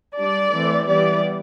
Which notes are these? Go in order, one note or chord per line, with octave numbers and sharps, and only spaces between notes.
G3 D4 D5
E3 A3 C4
E3 G3 B3 D5